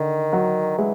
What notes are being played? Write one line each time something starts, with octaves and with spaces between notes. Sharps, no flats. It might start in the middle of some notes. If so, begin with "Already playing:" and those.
Already playing: D3 D#3
F#3
E3 G#3